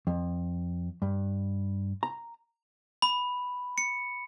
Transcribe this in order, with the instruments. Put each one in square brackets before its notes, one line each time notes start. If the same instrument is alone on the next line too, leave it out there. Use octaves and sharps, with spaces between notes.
[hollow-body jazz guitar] F2
G2
A#5
[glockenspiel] B5
C#7